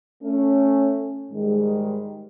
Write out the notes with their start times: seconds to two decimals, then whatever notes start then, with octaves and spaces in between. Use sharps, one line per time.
0.24 A3 C#4
1.32 G#2 D#3 G3 G#3